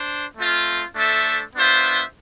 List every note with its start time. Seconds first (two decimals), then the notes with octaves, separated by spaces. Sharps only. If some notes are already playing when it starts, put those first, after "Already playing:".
Already playing: D4 C5
0.37 A3 C4 F4
0.96 A3 D4 A4 C5 E5
1.55 B3 D4 F4 C5 E5